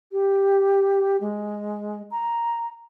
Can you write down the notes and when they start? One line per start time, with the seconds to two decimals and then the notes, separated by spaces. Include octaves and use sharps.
0.12 G4
1.21 G#3
2.11 A#5